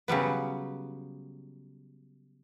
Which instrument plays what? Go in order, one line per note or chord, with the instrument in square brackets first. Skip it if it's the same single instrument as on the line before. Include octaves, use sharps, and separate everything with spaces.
[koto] C#3 F#3 G3 B3